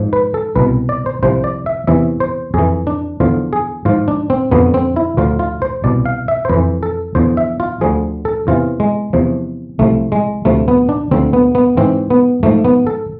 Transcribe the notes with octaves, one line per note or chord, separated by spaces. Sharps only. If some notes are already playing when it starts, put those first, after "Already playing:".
Already playing: G#2 F3
B4
A4
C2 B2 B4
D5
C5
C2 C3 F3 C5
D5
E5
E2 C3 E3 E5
C5
F2 E3 G#4
D4
E2 D3 F3 F4
G#4
G#2 F3 F4
D4
C4
F2 D3 F3 B3
C4
E4
D2 D3 F3 F4
F4
C5
C2 B2 D5
F5
E5
C5
F2 E3 B4
A4
E2 D3 F3 C5
E5
F4
D2 D3 F3 G#4
A4
E2 C3 E3 F4
G#3
E2 C3 F3
C2 C3 F3 A3
G#3
D2 C3 F3 A3
B3
D4
D2 D3 F3 C4
B3
B3
G#2 E3 C4
B3
G#2 F3 A3
B3
A4